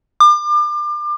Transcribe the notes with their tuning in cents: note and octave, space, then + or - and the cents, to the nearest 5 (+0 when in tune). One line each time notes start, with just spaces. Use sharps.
D6 +35